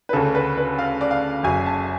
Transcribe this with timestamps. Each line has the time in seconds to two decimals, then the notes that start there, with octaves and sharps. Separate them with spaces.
0.09 B4
0.13 D2 C#3 A4
0.35 B4
0.58 B4
0.78 F5
1.01 D5
1.11 F5
1.43 F#1 F#2 C#3 G#5
1.66 A5